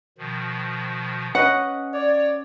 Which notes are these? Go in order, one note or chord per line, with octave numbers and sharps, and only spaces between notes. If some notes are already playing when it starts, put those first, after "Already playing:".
B2 D#3 F3
C#4 B4 D#5 F#5
C#5 D5